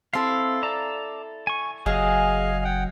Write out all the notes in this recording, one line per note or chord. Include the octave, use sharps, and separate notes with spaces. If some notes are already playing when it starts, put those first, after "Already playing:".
C4 E4 A4 F5 C6
D5 A5 A#5
G#5 C#6
F#1 F#3 G#4 D#5 F5 G#5
F#5 G5